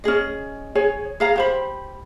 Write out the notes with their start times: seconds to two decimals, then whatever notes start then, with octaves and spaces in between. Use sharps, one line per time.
0.04 C#4 D#4 G#4 D#5
0.75 G#4 C#5 G#5
1.20 G#4 F5 A#5
1.36 G4 C5 B5